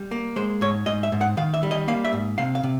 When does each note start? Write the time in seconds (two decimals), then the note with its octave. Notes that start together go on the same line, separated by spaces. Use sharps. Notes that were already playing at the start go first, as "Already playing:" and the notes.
Already playing: G3
0.11 A#3
0.36 G#3 C5
0.61 G#2 C#5
0.86 G#2 D#5
1.03 E5
1.12 G#2
1.21 F#5
1.37 D#3 F5
1.54 E5
1.63 G3
1.71 D#5
1.88 A#3 F5
2.05 E5
2.13 G#2
2.38 C3 F5
2.55 F5
2.63 C3